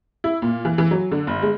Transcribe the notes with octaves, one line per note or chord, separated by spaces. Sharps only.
E4
A#2
E3
E3
F#3
D3
G1
G#3